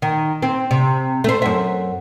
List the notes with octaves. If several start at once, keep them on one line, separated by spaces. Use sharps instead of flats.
D#3
C4
C3
A3 C5
F#2 E5